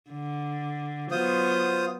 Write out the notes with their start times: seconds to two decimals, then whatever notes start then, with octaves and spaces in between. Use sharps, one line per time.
0.10 D3
1.11 F#3 B3 F4 C5 D#6